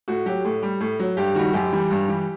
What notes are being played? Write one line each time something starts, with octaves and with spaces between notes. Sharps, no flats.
A2 F#4
F#3 G4
A2
G3
A2
F#3
G2 G4
D#3 G3 F#4
F#2 G4
E3 G3
G2
E3 G3